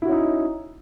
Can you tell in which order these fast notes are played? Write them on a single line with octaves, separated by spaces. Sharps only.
E4 F#4 C#4 D#4